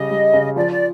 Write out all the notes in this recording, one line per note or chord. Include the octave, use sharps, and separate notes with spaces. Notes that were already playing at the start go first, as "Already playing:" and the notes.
Already playing: C#3 G3 D#5
G3
C#3
F3 D5
D5